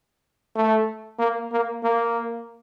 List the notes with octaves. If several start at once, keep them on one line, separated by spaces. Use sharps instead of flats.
A3
A#3
A#3
A#3